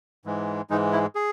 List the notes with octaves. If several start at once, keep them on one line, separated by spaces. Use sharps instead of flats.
G#2 E3 G#3
G#2 E3 G#3 D#4
E4
G#4